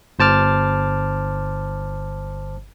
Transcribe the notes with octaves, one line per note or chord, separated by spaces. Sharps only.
G1 C5 A5 D6 F6